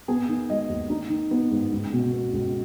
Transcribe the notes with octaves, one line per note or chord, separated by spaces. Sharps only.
B3 G#4
D#3
G#3 D#5
D#2
D#4
D#3
B3
G#2
C#2
B2
B3
C#2